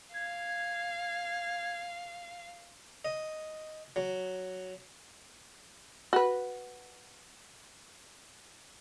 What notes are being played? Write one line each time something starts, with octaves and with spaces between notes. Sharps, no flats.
F5 G#6
D#5
F#3
F#4 B4